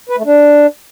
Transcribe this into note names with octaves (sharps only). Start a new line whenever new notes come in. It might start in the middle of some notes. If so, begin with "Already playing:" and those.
B4
A3
D4